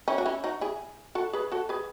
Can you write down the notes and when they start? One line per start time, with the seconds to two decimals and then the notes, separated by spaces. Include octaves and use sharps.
0.08 C#4 E4
0.18 F#4
0.26 C#4 E4
0.44 D#4 F#4
0.61 E4 G#4
1.15 F#4 A4
1.33 G#4 B4
1.52 F#4 A4
1.69 G#4 B4